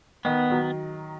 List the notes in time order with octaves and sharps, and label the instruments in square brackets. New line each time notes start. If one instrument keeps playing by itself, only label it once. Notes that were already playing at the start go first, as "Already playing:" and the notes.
[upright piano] D#3 [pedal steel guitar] B3
[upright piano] D#3 F#3